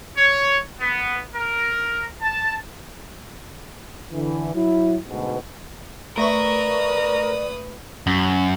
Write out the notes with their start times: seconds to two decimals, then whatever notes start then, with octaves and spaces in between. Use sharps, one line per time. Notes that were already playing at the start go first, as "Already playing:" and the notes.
0.17 C#5
0.80 B3
1.35 A#4
2.21 A5
4.12 D3 E3
4.55 F#3 E4
5.08 D2 G#2 B2
6.17 A3 A#4 B4 D5 E5 C#6 D#6
8.07 F#2